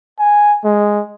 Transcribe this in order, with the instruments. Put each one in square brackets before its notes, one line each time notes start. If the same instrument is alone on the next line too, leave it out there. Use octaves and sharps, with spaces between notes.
[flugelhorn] G#5
G#3